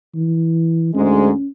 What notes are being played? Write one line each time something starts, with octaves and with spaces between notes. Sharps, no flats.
E3
D2 G#2 G#3 C#4